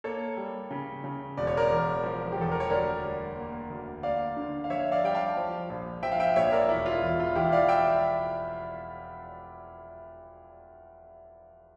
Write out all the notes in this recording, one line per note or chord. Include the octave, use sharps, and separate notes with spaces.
A#3 A4 C#5
G3
C#3
C#3
E1 D5
C#5
A#4 D5
E2
F3
G4
E2 A4
A#4
C#5
D2 A#4 D5
G3
A#3
D2
A#3 D5 F5
D3
F5
F2 C#5 E5
D5 F5
G3 G5
F5 A5
F3
A#1
F3 E5 G5
F5
E5 G5
A#1 C#5 E5
A#4 D5
E1 E4
F4
E2
F4
E2 E4 G4
D5 F5
E5 G5